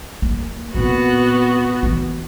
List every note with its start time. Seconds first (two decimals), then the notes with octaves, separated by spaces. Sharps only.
0.22 A#3
0.75 A#2 B3 C4 F#4
1.83 E3 B3